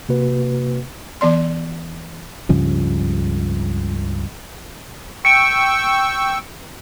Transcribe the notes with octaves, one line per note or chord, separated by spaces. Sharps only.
C3 A#3 F#4 B4
E3 B3 D5 C6
C#2 G2 C#3 F3
G5 C#6 E6 C#7 D7